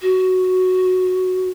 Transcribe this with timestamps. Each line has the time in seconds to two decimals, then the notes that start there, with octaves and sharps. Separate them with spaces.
0.01 F#4